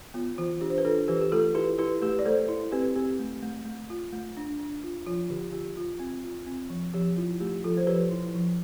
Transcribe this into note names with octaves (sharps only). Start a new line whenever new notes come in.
B3 F4
E3 F4
D4 G4
C5
B4
D4 F4 A4
E3 G4 B4
G4
A3 F4 A4
E4 G4 B4
E4 G4 B4
A3 G4 B4
D5
A3 A4 C5
E4
C4 G4 B4
C4 G4
A3
A3
A3
F4
A3
D4
D4
F4
F3 F4
D3 G4
F4 G4
F4
C4
F4
C4
F3
F3 G4
E4 F4
A3 G4
F3 F4 A4
C5
F3 G4 B4
E4
F3